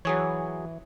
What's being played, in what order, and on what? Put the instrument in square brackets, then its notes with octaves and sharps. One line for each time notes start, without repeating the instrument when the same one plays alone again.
[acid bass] E3 [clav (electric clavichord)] F#3 G#4 C#5